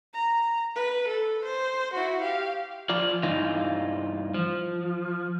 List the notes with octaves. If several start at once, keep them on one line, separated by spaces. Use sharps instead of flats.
A#5
B4
A4
C5
E4 F#4
G4 F5
F3 F4 D5
G2 E3 D#4 F4
F3